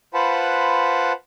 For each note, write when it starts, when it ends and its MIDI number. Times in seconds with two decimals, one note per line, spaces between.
0.14 1.12 65
0.14 1.12 71
0.14 1.12 72
0.14 1.12 78
0.14 1.12 81
0.14 1.12 83